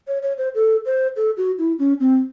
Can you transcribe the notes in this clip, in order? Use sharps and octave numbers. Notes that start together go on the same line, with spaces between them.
C#5
C#5
C5
A4
C5
A4
F#4
E4
C#4
C4